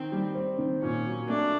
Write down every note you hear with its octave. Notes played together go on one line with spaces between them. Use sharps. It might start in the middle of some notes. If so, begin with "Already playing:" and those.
Already playing: D#3 C4
G3
C4
D#3
A#2 C#4
F#3
A3 D4